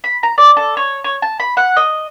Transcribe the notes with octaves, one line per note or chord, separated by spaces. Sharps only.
B5
A#5
D5
A4
C#5
C#5
A5
B5
F#5
D#5